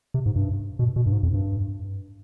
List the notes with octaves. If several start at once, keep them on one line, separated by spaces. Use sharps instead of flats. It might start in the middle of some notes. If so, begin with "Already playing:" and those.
C3
G#2
G2
B2
B2
G2
G#2
F2
G2